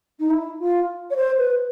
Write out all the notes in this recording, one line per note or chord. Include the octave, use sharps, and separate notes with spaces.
D#4
E4
F4
C#5
C5
B4